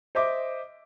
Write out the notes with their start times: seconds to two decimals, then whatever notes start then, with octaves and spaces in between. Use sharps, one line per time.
0.15 C5 D#5 E5 D6